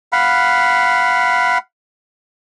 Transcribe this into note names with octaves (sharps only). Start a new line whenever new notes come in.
F5 F#5 B5